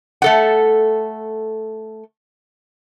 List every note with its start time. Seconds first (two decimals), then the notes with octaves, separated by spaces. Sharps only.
0.22 A3 A4 F#5